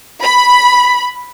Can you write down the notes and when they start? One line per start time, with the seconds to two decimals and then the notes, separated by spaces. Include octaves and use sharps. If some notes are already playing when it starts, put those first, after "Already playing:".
0.23 B5